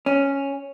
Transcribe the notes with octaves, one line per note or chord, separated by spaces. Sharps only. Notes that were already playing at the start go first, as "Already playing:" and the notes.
C#4